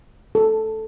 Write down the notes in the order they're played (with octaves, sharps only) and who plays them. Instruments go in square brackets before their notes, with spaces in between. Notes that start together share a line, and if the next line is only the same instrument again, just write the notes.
[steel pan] A4